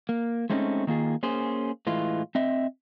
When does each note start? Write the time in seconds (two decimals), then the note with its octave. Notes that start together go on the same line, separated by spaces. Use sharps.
0.09 A#3
0.50 G#3 A3 C4 C#4 D#4
0.87 D#3 A#3 F4 G#4
1.23 A#3 C#4 G#4 C5
1.87 A2 E3 G#3 F4
2.35 C4 D#5 E5